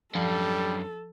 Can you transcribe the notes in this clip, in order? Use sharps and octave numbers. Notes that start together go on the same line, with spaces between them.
F#2 F3 G3 D4 A4